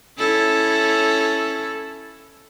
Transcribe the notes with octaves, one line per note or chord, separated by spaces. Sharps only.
C#4 E4 A4